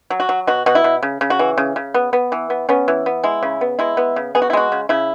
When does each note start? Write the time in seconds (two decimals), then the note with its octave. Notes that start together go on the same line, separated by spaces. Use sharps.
0.10 F#3
0.20 F#4
0.29 F#3
0.47 B2 F#4
0.66 B2 F#4
0.75 E4
0.84 B2
1.03 C#3
1.21 C#3
1.30 F#4
1.39 E3
1.58 C#3
1.76 C#3
1.94 B3
2.13 B3
2.32 E3
2.50 B3
2.69 B3 C#4
2.88 E3
3.06 B3
3.24 G#3 E4
3.43 C#3
3.61 B3
3.79 G#3 E4
3.97 B3
4.16 C#3
4.35 B3 G#4
4.42 F#4
4.50 E4
4.53 G#3 F#4
4.72 C#3
4.89 C#3 E4